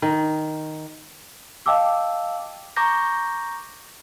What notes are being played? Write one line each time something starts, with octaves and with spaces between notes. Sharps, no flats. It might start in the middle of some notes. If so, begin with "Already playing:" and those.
D#3
D#5 F5 G5 A5 D6 E6
A#5 C#6 D6 G6 A#6